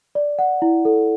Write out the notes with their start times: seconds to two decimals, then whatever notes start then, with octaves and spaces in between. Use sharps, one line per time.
0.15 D5
0.39 F#5
0.62 E4
0.85 A4